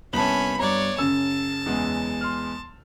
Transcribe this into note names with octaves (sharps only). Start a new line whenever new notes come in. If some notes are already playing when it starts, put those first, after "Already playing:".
C2 B3 C#4 A5 B5 F#7
G2 C#5 D5 A#5
F#2 C#3 A5 E6
E2 G#3 B3
C6 F6